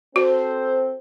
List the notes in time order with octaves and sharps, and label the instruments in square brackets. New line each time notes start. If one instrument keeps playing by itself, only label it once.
[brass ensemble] C4 A4 C5 [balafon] F#4